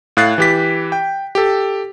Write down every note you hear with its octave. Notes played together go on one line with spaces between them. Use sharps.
A2 F5 F#6 A6 C7
E3 G4 B6
G5
G4 A4